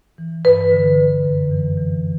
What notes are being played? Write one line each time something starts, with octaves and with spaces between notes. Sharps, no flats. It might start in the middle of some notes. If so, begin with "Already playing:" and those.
E3
G2 B4
D3
D3
F#2
E3
E3